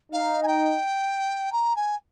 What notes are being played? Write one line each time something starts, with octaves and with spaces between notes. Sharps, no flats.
D#4 F5
G#5
G5
A#5
G#5